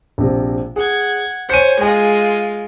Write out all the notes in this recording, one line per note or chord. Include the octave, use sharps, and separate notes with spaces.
A#1 C3
G#4 F#5 G#6
C5 C#5 G#5 C#7 D#7
G#3 F4 G#5